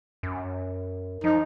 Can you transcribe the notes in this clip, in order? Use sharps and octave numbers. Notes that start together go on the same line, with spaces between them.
F#2
F3 D#4